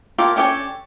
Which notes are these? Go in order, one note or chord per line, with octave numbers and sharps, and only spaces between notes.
F4 G4 A4 A#4 C#5
C#4 D4 G4 A4 C#5